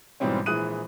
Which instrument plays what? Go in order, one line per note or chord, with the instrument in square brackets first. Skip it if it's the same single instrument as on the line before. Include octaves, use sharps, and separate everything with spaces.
[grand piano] G#2 B2 E3 G3 C4 C#4
A#1 E3 G#3 D#6 F#6 D#7